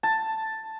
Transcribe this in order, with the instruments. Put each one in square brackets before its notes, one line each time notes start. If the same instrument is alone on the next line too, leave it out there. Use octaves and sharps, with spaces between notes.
[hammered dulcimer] A5